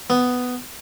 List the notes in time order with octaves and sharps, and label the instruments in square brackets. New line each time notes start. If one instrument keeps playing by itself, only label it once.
[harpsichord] B3